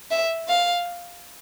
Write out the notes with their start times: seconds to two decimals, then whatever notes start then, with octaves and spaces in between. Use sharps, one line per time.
0.11 E5
0.48 F5